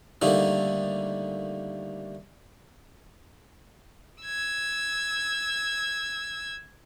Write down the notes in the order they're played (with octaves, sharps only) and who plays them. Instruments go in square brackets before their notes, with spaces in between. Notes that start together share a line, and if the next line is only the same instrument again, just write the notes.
[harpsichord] D3 D#3 G3 A3 A#3 D#4
[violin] E6 G#6